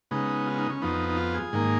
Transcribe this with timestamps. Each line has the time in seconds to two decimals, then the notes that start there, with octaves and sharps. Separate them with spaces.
0.11 C#3 G#3 B3 D#4
0.47 F4
0.58 D#4
0.70 C#4
0.82 F2 F3 B3 D#4
1.09 D#4
1.17 F4
1.34 G#4
1.53 G#2 D#3 A#3